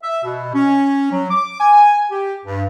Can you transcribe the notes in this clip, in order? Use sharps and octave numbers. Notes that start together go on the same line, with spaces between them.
E5
B2
C#4
F#3
D6
G#5
G4
G2